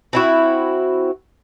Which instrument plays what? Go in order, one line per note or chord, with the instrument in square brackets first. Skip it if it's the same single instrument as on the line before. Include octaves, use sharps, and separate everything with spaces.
[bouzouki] C4 E4 F#4